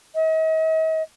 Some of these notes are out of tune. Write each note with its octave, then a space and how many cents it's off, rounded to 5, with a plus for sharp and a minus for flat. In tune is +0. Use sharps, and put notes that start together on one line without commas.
D#5 +45